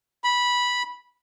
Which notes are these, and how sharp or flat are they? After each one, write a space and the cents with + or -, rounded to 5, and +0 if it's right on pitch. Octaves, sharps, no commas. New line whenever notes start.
B5 -10